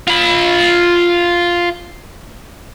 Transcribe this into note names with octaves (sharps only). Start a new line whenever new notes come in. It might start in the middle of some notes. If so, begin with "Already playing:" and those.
F4 B5